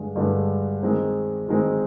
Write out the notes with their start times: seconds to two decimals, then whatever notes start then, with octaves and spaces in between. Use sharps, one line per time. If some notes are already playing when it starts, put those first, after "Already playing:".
Already playing: G2 D3 G#3
0.16 G2 D3 G#3
0.83 D#3 G#3 C4
1.48 D#3 G#3 C4